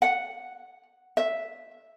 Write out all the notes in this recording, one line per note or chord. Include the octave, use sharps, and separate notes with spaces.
F#5
E5